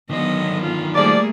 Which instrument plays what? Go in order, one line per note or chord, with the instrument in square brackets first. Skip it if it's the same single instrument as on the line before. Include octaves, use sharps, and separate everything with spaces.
[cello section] D3 F#3 B3 [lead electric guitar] D#3 C5 [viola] D#5
[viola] F4
[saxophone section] F3 D5 [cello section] G3 A3 [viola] A#3 G#4